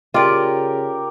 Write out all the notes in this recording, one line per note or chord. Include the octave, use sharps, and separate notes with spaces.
C#3 F4 G4 A#4 D5 G5